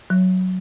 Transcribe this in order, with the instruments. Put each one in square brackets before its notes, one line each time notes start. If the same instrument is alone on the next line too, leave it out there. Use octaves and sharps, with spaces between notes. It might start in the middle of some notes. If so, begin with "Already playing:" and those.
[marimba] F#3